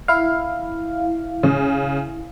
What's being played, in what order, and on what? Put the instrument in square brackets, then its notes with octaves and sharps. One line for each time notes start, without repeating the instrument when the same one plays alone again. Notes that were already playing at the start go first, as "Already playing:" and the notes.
[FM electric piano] E4 F5
[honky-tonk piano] C#3